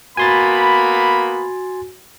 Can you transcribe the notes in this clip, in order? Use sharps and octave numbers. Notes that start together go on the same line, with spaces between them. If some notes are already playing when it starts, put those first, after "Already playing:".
A#3 B3 F#4 G#5 B5 C6 A6